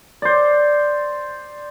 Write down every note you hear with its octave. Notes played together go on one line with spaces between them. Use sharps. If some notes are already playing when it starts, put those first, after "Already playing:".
C5 D5